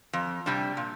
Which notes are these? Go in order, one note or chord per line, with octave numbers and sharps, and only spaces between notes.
F2
C3 G3 D4
A#2